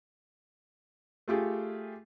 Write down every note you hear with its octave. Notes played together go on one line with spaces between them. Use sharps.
A3 F4 G4 G#4